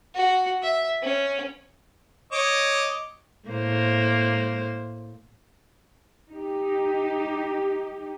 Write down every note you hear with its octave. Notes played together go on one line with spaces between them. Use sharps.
F#4
E5
C#4
C#5 D#5 D6
A2 A#3 C5
D#4 G4